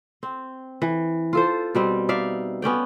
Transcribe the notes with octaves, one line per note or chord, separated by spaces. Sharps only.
C4
E3
F4 A4 C5
B2 G3 C4
D#4 D5 E5 F5
B3 C#4 D5 G5